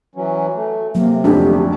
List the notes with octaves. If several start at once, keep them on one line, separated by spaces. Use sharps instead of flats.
E3 F#3 C#4
A3
C3 F#3 A#3
F1 F2 D3 D4 F#4 G4